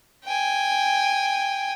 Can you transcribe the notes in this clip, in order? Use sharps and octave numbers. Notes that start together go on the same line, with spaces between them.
G5 G#5